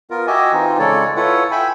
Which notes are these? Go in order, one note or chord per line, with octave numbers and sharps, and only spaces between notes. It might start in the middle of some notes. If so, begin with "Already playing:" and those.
B3 F4 A#4
F#4 G4 D#5 E5 G#5
E3 C4 D#4 F4
C#3 G#3 A4 C#5 D5
E4 F4 A4 B4 C#5 F#5
E5 G5 G#5 B5